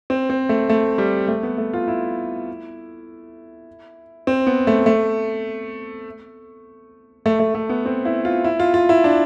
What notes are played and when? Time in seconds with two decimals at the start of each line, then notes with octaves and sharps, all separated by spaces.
0.10 C4
0.30 C4
0.49 A3
0.70 A3
0.98 G3
1.28 A3
1.43 B3
1.58 A3
1.73 F4
1.88 E4
4.27 C4
4.47 B3
4.67 A3
4.86 A3
7.26 A3
7.40 A3
7.55 A3
7.69 B3
7.86 C4
8.05 E4
8.25 F4
8.44 E4
8.60 F4
8.74 F4
8.89 E4
9.04 D4